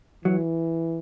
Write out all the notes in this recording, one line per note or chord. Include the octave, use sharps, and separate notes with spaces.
E3 F#3